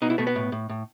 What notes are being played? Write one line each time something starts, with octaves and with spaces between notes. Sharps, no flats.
B2 D#4
E4
B2 A3
B3
A2
A2
A2